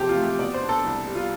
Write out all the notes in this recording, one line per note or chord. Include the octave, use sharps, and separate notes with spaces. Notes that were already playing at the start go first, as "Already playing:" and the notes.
Already playing: C3 F3 C4 G4 A4
F4
A3
G4
B2 D5
C5
D4
A4
C2
G3
F4